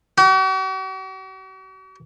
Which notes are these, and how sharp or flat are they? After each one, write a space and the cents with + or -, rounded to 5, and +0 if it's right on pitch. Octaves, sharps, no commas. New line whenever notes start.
F#4 +45